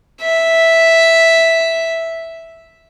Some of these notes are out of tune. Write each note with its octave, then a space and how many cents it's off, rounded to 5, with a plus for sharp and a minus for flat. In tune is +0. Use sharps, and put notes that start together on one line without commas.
E5 -5